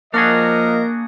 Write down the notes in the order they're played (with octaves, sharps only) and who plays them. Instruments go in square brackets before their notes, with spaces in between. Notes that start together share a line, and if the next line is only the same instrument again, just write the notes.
[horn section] F3 D#5 [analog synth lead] A#3 [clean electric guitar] D4 F#4 G#4 [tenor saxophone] A#4